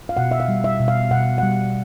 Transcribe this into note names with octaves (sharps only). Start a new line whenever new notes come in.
F5
B2 F#5
E5
F5
G3
E5
B2
F5
B2 F#5
G3 F#5